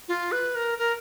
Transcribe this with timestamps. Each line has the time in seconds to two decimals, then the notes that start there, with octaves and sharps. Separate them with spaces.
0.08 F4
0.32 B4
0.55 A#4
0.78 A#4